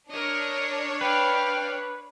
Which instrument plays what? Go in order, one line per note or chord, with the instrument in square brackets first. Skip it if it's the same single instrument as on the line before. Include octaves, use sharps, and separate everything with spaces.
[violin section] D4 C#5 [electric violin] A#4 D#5
[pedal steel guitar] B4 [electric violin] F5 [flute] G5